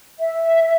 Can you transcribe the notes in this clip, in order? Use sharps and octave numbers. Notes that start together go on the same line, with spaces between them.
E5